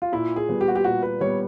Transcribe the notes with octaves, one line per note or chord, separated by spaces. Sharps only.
F4
A#2 E4
G#4
G3 B3
G4
F#4
G4
A#2 F#4
B4
G3 B3 C#5